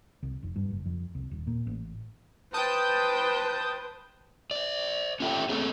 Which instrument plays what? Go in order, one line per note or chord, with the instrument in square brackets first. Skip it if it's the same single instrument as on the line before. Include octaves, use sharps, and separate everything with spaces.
[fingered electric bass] C2
F1
G2
F#1
F2
C2
D#1
A#2
A1
[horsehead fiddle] B4 C5 [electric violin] G5 [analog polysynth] A5 D#6 G6
[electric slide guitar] C5 D5
C#4 F4 G4 A4 E5 G5
A3 C4 C#4 G#4 A4